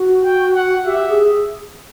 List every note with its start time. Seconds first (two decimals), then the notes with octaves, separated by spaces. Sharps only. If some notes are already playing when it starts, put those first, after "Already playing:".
Already playing: F#4
0.24 G5
0.55 F#5
0.85 G4 E5
1.09 G#4